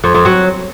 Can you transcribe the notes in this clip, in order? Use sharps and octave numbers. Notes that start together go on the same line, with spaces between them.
F2
F2
F#3